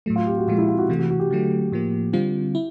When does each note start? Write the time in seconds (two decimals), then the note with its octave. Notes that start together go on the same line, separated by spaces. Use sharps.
0.06 A2 F#3 A3
0.16 F4
0.26 G4
0.38 F#4
0.48 A#2 F3 G#3 F4
0.58 E4
0.69 F4
0.78 F#4
0.89 C3 E3 A3
0.99 F#4
1.10 F#4
1.20 G4
1.31 D3 F#3 A3
1.72 A2 F3 A#3
2.13 D3 G3 C4 F4
2.55 E4